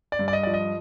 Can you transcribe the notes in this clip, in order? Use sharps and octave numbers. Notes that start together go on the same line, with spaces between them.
D5
G2
D5
D#5
F3 D5
D#5